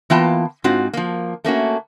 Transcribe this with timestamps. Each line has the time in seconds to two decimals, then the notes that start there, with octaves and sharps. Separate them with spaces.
0.10 E3 A#3 B3 F4 G5 A5
0.64 G#2 C4 F4 F#4
0.93 F3 A#3
1.44 A3 A#3 C#4 F#4